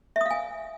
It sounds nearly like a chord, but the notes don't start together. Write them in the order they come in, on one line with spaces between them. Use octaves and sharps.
E5 D#6 F5 G#5